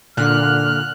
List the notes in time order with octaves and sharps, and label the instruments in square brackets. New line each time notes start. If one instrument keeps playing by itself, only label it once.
[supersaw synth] A#2 [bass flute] D3 [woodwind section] F6 [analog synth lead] F#6